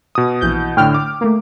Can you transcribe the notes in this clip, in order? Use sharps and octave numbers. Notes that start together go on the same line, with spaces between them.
B2 D#6
A#1 E3 G6
A2 D3 G5 F6
D6
A3 A#3